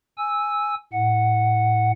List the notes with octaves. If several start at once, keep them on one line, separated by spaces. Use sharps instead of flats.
G#5 E6
A2 F#5